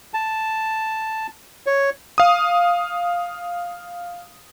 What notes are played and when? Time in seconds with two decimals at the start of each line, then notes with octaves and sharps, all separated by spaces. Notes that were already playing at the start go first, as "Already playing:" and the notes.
0.14 A5
1.66 C#5
2.18 F5 D#6